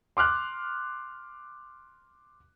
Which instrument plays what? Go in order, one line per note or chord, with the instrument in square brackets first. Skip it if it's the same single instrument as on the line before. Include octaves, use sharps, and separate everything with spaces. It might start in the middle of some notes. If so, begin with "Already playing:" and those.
[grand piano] C6 D6 F6 F#6